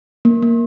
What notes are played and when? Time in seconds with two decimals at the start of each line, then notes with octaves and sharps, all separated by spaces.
0.25 A#3
0.42 A#3